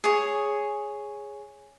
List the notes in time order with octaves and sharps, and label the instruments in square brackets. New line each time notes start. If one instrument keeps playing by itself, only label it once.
[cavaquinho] G#4 C#5